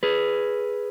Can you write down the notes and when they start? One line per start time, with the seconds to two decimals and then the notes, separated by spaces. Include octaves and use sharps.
0.03 G#4 B4